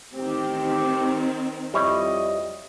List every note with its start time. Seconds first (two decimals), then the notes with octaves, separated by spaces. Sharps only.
0.15 A1 D#3 C4 G4
1.74 F2 G3 E4 C#5 D#5